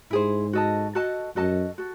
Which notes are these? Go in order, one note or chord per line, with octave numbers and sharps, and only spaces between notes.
G#2 E4 G#4 C5
F#4 A4 D#5 A5
F#4 A4 D#5 A5
F#2 F#4 A4 D#5 A5
F#4 A4